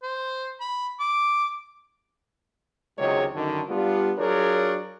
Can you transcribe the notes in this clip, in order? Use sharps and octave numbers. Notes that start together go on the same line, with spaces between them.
C5
B5
D6
C#2 C3 D#3 F#3 G#3 C#5
F#2 D3 D#3
G3 B3 D4 F4
F#3 D4 F4 G#4 A#4 C#5